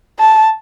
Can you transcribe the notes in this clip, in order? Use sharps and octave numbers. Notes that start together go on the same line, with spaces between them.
A5